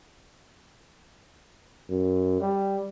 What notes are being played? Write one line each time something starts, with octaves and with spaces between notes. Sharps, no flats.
F#2
G3